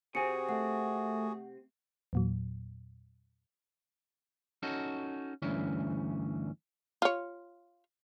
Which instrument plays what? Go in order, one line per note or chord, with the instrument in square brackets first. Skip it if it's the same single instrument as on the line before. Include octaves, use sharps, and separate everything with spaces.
[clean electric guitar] C3 C4 [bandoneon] F#4 G#4 [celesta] G#5 C#7
[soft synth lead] A3 [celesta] F#5
[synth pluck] E2 A#2 F#3
[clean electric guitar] C#4 D#4 F#4 A4
D2 G2 E3 C#4
[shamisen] F4 C#5